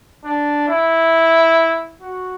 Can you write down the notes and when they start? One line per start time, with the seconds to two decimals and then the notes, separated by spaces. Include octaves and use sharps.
0.24 D4
0.68 E4
2.02 F#4